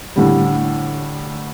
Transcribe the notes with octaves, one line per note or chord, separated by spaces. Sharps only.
A2 D3 G3